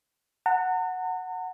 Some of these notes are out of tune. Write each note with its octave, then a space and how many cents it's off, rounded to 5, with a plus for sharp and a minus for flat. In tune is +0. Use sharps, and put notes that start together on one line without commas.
F#5 +0 A#5 -45